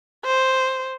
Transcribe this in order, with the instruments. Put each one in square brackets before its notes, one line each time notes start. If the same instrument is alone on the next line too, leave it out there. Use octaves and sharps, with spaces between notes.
[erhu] C5